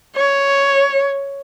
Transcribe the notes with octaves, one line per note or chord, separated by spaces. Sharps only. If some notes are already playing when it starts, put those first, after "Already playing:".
C#5